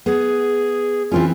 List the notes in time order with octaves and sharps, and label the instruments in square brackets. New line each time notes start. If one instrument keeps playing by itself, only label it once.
[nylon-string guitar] B3 [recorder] G#4
[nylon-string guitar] E3 C4 C#4 [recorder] F4